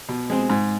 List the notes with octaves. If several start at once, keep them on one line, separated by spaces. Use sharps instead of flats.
B2
G#3 C4
G#2